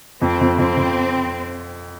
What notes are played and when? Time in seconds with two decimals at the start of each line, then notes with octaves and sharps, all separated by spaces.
0.21 F2 C4
0.41 F2
0.59 F2 C4
0.77 F2